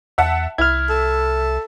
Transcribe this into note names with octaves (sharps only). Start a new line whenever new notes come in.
E2 E5 F#5 A5
C2 E4 F6 G#6
A4